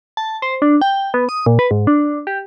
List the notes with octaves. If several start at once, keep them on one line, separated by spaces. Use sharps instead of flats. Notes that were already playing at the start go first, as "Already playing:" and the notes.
A5
C5
D4
G5
B3
D#6
A#2
B4
G#2
D4
G4